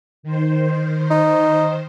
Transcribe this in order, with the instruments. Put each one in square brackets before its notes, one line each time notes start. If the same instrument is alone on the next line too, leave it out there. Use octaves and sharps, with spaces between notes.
[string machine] D#3 C5
[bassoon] D#4